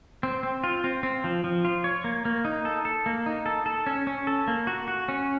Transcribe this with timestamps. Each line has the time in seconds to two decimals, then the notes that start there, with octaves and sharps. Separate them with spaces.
0.23 C4
0.43 C4
0.64 F4
0.84 C4
1.03 C4
1.24 F3
1.44 F3
1.65 F4
1.84 C#5
2.04 A#3
2.25 A#3
2.45 D#4
2.65 A4
2.85 A4
3.06 A#3
3.26 D#4
3.46 A4
3.66 A4
3.86 C#4
4.07 C#4
4.27 A4
4.48 A#3
4.67 F#4
4.88 F#4
5.08 C#4